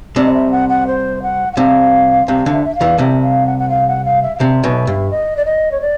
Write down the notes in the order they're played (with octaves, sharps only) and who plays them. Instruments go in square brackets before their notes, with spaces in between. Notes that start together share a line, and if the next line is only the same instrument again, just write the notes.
[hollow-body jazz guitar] C2 C3 [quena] D5
[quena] D#5
E5
F#5
F#5
C5
F#5
F#5
[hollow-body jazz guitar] C2 C3 [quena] F5
[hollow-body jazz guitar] C2 C3 [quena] F5
[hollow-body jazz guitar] D2 D3
[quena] E5
E5
F5
[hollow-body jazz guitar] E2 E3
[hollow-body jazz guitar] C2 C3 [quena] E5
[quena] F5
F#5
F#5
F5
F#5
F5
E5
F5
[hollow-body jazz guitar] C2 C3 [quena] E5
[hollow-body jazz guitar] B1 B2
G2
[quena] D#5
D5
D#5
C#5
D5